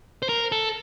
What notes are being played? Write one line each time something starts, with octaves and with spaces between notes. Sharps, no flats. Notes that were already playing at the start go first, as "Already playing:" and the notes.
C5
A#4
A4